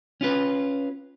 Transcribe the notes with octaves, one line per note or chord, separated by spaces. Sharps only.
C#4 F4 B4